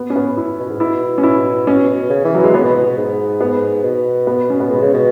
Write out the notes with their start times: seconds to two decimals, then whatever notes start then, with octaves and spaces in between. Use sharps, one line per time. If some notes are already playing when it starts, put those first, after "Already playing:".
Already playing: B3
0.10 C#4
0.16 B3
0.37 E4
0.59 B2
0.69 G#2
0.80 B2 E4
1.18 C#4
1.23 E4
1.67 B2 C#4
1.89 B2
2.10 C#3
2.25 E3
2.34 F#3
2.39 E3 G#3
2.54 C#3 B3
2.64 B2
2.76 B2
2.86 B2
2.97 G#2
3.41 B3
3.83 B2
4.27 B3
4.50 C#4
4.60 B3
4.70 B2 G#3
4.82 C#3
4.94 B2